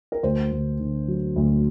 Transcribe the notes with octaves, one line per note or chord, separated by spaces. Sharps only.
A#4
D2 C5
D2
D3
F#3
D2